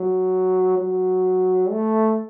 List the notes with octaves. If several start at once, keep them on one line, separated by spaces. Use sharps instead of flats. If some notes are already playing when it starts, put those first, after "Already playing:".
Already playing: F#3
F#3
A3